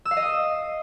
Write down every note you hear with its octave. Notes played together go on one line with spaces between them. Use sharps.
E6
F5
D#5
D#6